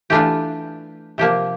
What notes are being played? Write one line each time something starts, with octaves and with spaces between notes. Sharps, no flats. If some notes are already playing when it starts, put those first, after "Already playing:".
E3 A3 D4 F4 G4
C3 F3 A#3 G4